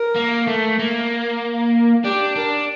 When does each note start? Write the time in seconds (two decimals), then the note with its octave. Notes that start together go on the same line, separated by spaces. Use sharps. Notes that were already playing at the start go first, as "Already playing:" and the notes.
Already playing: A#4
0.16 A#3
0.47 A3
0.79 A#3
2.04 D4 G4
2.36 D4 A#4